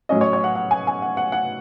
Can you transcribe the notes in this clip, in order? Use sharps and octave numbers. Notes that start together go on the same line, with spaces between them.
A2 F#3 C#4 D#5
C#5
C#5
F#5
F#5
G#5
G#5
F#5
F#5
F#5